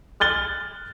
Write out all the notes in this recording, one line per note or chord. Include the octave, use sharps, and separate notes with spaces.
F6 F#6 A6 G7